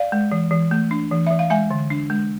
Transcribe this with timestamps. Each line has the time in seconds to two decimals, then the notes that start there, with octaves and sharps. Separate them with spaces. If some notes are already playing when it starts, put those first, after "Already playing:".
Already playing: D5 F5
0.12 G#3
0.32 E3
0.51 E3
0.71 A3
0.91 D4
1.11 E3
1.27 E3 E5
1.39 F5
1.50 G#3 E5 G#5
1.70 D3
1.90 D4
2.10 G#3